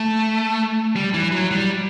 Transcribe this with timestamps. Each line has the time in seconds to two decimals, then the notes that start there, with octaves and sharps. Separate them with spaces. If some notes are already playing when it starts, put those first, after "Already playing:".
Already playing: A3
0.96 G3
1.14 E3
1.32 F#3
1.51 G3